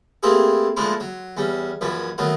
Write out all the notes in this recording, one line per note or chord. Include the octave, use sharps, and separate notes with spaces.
A3 A#3 C4 E4 G4 G#4
A#2 F3 G#3 A3 D4 E4
F#3
E2 G3 C#4
A#1 F#2 E3 C#5 B5
D#3 F#3 A3 B3